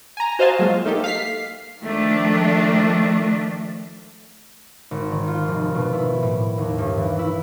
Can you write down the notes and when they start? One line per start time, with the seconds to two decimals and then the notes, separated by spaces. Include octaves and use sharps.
0.17 G#5 A#5
0.39 F#4 C5 D#5 F5 G#5 A5
0.59 F#3 G#3 A#3 F4
0.85 A3 A#3 D#4 G4 A4
1.04 F5 B6 C7
1.81 D#3 F3 A3 D4
4.91 G#1
5.12 D#3
5.28 F4
5.48 F1
5.75 B2
5.93 E4
6.23 A2
6.58 D#2
6.78 G2
6.98 E3
7.19 E4